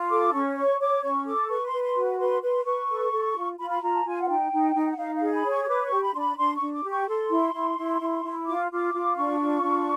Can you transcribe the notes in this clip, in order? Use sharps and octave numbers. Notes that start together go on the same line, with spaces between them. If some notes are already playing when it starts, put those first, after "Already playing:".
Already playing: F4
A4 D6
C#4 C#6
C#5 C#6
C#5 D6
C#4 C#6
A4 D6
B4 C#6
C6
B4
C6
F#4
B4 C6
B4 C6
B4 C#6
A4
A4
F4
F4 B5
B5
F4 A#5
A5
F4 G#5
F#5
D#4 G5
D#4
D#4
F#5
D#4 F5
F5
G#4
B5
C#5
C#6
C#6
B4 D6
C#6
G4
B5
D4 C6
B5
D4 C6
C#6
D4
D6
G4
C#6
A4 C6
E4
E4
E4
E4
E4
F4 D6
F4 D6
F4
D4 C#6
F4
D4